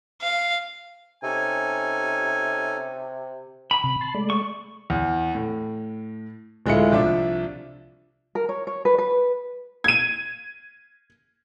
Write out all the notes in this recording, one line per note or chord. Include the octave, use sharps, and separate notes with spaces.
F5
C3 C#4 D#4 A4 G#5
B5
C3
A5 C6
G#3 A3 D5
C#6
E2
A2
D1 G#3 A3 E4 F4 C#7
C2 F3 D4 E5 D6
A#4
C#5
C#5
B4
B4
G#6 D#7